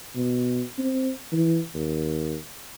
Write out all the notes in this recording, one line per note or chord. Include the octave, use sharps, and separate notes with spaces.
B2
C4
E3
D#2